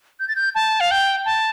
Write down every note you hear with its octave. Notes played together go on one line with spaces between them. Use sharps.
G6
A6
G6
A5
F5
G5
A5